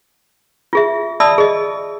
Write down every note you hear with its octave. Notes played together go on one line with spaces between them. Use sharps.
F4 G#4 E5
D5 E5 A5 B5 D#6 E6
G#4 D#5